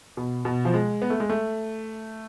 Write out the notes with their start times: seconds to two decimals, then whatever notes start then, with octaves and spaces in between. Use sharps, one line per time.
0.17 B2
0.45 B2
0.65 F3
0.74 G#3
1.02 B3
1.10 A3
1.20 G#3
1.30 A3